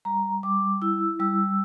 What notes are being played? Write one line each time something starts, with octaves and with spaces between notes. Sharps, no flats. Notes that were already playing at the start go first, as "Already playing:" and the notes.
G3 A#5
G3 D6
E4 E6
G3 E6